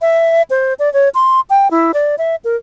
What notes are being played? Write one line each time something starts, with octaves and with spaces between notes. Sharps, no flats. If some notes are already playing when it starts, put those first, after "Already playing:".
E5
C5
D5
C#5
C6
G5
E4
D5
E5
A#4